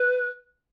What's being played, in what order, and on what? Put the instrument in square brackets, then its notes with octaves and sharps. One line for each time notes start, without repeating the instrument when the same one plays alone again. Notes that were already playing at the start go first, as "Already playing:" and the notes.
Already playing: [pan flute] B4